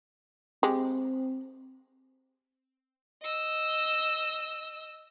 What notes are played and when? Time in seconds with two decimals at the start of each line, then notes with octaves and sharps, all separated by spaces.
0.63 G#3 C4 G4
3.22 D#5 E6